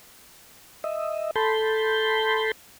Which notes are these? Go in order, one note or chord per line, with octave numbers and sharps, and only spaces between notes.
D#5 E5
A4 A5 B5 C6 G6